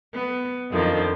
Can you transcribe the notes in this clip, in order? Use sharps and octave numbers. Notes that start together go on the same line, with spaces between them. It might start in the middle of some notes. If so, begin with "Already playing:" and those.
B3
F2 D3 D#3 F3